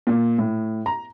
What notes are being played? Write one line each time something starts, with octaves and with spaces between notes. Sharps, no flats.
A#2
A2
A#5